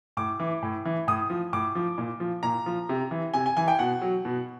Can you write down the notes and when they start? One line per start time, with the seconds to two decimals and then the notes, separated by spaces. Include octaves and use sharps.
0.17 A2 D6
0.39 E3
0.63 A2
0.85 E3
1.08 A2 D#6
1.30 F3
1.53 A2 D6
1.75 F3
1.98 A#2
2.20 F3
2.43 A#2 A#5
2.66 F3
2.89 C3
3.11 E3
3.34 C3 G#5
3.46 G#5
3.57 E3 G#5
3.68 G5
3.79 B2 F#5
4.02 F#3
4.25 B2